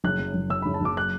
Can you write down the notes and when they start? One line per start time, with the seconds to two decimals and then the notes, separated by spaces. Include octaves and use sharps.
0.04 F#1 F#6
0.19 F#2
0.34 F#1
0.50 F#2 E6
0.62 B5
0.66 F#1
0.74 A5
0.81 F#1 D6
0.97 F#6